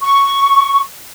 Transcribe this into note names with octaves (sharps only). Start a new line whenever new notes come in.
C#6